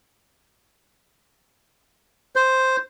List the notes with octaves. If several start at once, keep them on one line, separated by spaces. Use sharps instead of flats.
C5